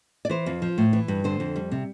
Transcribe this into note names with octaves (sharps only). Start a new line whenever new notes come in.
D5
E3 C5
F2
F3
A2
E3
G2
D3 C5
F2
G3
C3